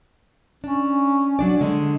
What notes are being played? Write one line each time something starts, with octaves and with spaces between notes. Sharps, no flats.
C#4 D4
F#3 D4 D5
D3 G#3